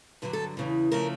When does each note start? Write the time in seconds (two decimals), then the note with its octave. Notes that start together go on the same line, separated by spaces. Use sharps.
0.22 G2 D3 F#3 B4
0.33 A4
0.57 E2 C#3 E3
0.92 C#3 F3 A3 A#4